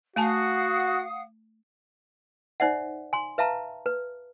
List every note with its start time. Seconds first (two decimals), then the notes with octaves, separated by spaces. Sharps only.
0.16 A3 F#4 F5 F#5 G#5 A5 D#6
2.60 D#4 C5 D5 E5 F#5
3.13 G#5 C6
3.38 B4 E5 F5 A5 A#5
3.86 B4